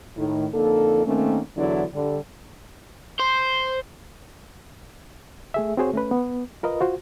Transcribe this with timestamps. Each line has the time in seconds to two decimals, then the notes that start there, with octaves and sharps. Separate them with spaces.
0.17 A2 D#3
0.53 F2 D3 A#3 D#4 A4
1.05 D#3 A3 A#3 C4 C#4
1.57 E2 D3 F#3 D4 E4 D5
1.94 D3 G3
3.19 C5
5.54 A3 G#4 E5
5.77 C4 F#4 G#4 C5 C#5
5.93 A3 C#4 B4
6.11 B3
6.63 F4 A#4 B4 D#5
6.80 F4 F#4 C5